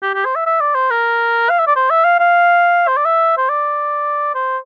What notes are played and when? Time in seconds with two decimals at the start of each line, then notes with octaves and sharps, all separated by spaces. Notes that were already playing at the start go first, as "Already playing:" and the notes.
0.03 G4
0.15 G4
0.25 C5
0.36 E5
0.46 E5
0.60 D5
0.75 C5
0.90 A#4
1.50 F5
1.59 E5
1.67 D5
1.76 C5
1.90 E5
2.04 F5
2.19 F5
2.87 C5
2.97 D5
3.05 E5
3.37 C5
3.50 D5
4.35 C5